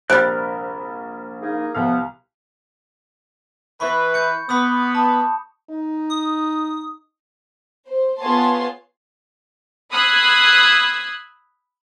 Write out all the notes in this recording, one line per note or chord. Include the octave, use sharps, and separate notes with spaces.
A#1 C3 G3 A#4 B5 F6 F#6 A6
A#3 D#4 G#4
C2 E3 F3 B3 F5
E3 B4 B5 C#6
G6 C#7
B3 B5 D6 D#6
A5
D#4
D#6
C5
B3 F4 G#4 C#5 A5 C6
B5 D#6 E6 F#6 G#6 C7